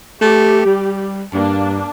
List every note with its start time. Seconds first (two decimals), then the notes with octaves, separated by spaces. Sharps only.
0.21 A3 G4
0.65 G3
1.33 G2 A#3 D4 A5